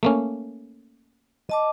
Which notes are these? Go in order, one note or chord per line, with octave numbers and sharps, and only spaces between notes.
A3 A#3 C#4
D#5 A5 D6